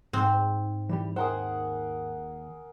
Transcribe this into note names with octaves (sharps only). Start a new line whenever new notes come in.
G#2 C4
E3 G3 G4
D#2 G#4 A#4 C5 F#5 G5